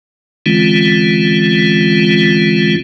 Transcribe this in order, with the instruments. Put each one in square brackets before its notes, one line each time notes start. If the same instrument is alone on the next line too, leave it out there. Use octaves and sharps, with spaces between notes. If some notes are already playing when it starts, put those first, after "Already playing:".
[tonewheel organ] D3 E3 G#3 C4 C#4 F4